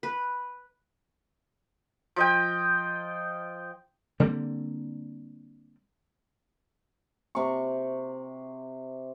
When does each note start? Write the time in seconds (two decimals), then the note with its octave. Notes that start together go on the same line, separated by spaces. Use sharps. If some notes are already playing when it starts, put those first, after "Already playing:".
0.03 B4
2.16 F3 D#5 G5
4.20 D3 G3 A#3 C4
7.35 C3 C#6